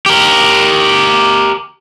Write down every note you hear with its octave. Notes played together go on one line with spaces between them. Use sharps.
G4 A#4